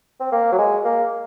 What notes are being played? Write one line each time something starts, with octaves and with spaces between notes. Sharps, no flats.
C4
A#3
F#3
G#3
A#3